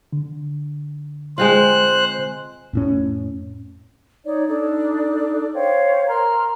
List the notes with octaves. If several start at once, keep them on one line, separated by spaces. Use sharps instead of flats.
D3
G#3 C4 F4 C5 F#6
F2 A2 C#4
D#4 C#5 D5
D4 D#4 A4 D5
C5 C#5 F5 G5
A#4 A#5 C6 F6